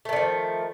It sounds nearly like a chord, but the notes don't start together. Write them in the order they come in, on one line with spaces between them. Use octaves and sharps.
A3 D#3 D3 F3